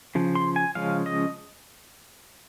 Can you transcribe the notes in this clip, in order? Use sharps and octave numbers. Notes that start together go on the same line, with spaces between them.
C#3 F3
C6
G#5
C#3 F3 G#3 C#4 F5
D#5